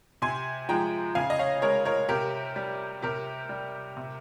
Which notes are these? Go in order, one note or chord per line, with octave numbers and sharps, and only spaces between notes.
C3 G#5 C6
F3 G#3 G5 A#5
C#3 F5 G#5
D#5
C#5 F5
G#3 A#4 C#5
A#4 C#5
C3 G4 A#4
G3
C3 G4 A#4
G3
C3